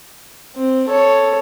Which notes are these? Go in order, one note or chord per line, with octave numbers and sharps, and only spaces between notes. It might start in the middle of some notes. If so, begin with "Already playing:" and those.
C4
A4 C#5